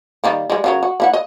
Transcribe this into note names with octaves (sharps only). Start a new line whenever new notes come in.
D#3 G3 A#3
G3 G#3
C#3 F#3 A#4
F#4
A#3 E4 F#5
D#5